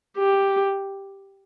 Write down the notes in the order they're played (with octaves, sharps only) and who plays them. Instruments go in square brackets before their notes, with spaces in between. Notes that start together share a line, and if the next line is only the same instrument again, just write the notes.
[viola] G4